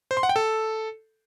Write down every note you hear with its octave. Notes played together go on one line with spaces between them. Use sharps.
C5
C6
F#5
G5
A4